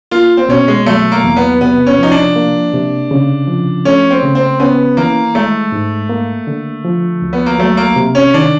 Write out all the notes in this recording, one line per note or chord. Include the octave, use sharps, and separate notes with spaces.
A#3 F4
C4
B2 C#4
G#3
F#3 A3
A#3
E2
B3
C3 B3
C#4
F3 D#4
D4
A#3
C3
C#3
F3
A3 C#4
C4
C#3
C4
B3 C#4
E3 A#3
G#3 A3
G#2
A#3
D3
F3
D2
B3
A#3
F#3 A3
A#3
C3
C#4
D#3 D4